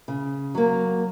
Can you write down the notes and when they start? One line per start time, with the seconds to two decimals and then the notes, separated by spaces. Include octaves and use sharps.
0.08 C#3
0.55 F#3 A#3